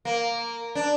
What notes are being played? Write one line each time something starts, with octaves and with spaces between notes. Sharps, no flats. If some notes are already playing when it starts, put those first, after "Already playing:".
A#3
D4